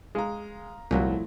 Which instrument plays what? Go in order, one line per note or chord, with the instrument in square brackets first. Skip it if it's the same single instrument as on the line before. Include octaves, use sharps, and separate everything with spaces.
[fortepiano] G#3 [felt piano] F5 A#5
[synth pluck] C2 [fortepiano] A#2 F#3 [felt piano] F3 A3 E4